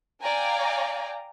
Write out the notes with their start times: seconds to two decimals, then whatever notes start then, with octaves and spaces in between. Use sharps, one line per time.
0.22 D5 F5 G5 G#5 A#5